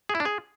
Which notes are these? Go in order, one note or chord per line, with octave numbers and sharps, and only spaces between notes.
G#4
E4
D4
G#4